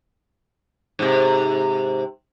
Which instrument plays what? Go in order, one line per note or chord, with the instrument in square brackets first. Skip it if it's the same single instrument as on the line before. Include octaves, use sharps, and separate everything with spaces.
[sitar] G#2 C3